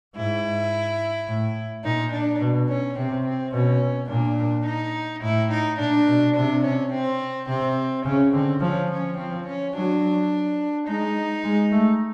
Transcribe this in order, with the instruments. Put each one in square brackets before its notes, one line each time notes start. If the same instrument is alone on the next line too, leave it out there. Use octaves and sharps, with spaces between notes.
[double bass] G#2 [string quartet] E4
[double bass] A2
[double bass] A#2 [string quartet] D#4
[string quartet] D4
[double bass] B2
[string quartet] C#4
[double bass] C3 [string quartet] C4
[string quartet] C4
[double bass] B2 [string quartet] C#4
[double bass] A#2 [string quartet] D4
[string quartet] D#4
[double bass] A2 [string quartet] E4
[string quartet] D#4
[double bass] A#2 [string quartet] D4
[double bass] B2
[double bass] C3 [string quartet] D4
[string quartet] C#4
C4
[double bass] C3 [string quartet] C4
[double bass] C#3 [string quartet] C#4
[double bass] D3 [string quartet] C4
[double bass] F3 [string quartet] C#4
[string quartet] C#4
[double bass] F3 [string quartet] C4
[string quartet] C#4
[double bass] F#3 [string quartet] D4
[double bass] G#3 [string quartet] D#4
[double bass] G#3
A3